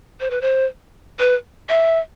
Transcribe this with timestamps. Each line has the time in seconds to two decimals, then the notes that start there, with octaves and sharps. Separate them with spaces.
0.20 C5
0.31 B4
0.42 C5
1.19 B4
1.69 E5